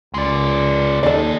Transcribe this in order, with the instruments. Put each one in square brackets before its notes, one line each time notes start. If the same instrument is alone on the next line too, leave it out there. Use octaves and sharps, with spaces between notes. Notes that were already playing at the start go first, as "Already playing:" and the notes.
[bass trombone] C#2 [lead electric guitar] G#3 D5
[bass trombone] D#2 [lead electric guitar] A#2 D#5 [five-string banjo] A4 D5